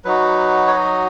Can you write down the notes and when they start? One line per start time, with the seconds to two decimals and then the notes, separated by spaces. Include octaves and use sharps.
0.05 F#3 D#4 F#4 B4
0.67 C#5
0.72 D#5